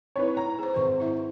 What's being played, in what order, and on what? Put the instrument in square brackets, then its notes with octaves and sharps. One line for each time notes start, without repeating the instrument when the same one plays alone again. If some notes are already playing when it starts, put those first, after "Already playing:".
[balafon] C4 D#4 E4 [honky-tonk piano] B4 C#5
[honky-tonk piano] A#5
[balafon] G#4 C5
[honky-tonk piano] G#1 C5 [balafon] B4 C#6
[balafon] E4 E5